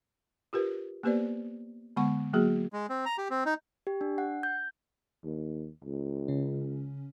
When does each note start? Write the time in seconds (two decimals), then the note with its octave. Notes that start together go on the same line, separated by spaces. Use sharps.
0.53 F4 G4 A#4 B4
1.03 A#3 B3 G4 B4 C5 D5
1.96 D3 G#3 B3 F#5 C#6
2.33 F#3 A#3 F#4 G#4
2.73 G#3
2.89 C4
3.05 A#5
3.18 G4
3.30 C4
3.46 D#4
3.87 G4
4.01 D4
4.18 F#5
4.43 G6
5.24 D#2
5.84 C#2
6.28 C#3 C#4